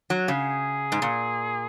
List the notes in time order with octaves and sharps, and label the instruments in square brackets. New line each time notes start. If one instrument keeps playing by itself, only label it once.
[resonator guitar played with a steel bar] F#3
[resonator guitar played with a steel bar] C#3 [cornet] G#4
[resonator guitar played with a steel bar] G#2
A#2